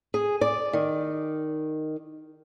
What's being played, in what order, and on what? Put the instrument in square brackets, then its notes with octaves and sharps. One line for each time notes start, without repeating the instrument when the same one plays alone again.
[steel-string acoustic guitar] G#4
D5
D#3